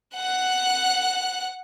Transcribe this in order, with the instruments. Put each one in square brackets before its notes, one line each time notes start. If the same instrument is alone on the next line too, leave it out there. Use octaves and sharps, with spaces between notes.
[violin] F#5 F#6